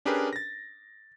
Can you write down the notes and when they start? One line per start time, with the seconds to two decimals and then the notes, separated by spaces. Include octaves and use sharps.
0.05 C#4 D4 G4 G#4 A#4 B4
0.33 A6 A#6